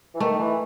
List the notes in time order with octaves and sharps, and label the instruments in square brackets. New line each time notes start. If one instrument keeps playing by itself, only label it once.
[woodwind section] E3
[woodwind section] D#3 [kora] A3
[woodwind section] E3